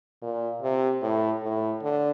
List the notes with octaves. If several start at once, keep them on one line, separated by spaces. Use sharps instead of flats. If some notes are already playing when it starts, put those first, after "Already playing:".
A#2
C3
A2
A2
D3